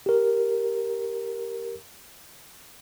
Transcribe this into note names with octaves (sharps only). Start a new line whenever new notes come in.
G4 A#4